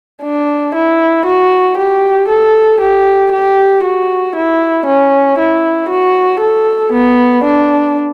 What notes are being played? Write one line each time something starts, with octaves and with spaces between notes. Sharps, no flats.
D4
E4
F#4
G4
A4
G4
G4
F#4
E4
C#4
E4
F#4
A4
B3
D4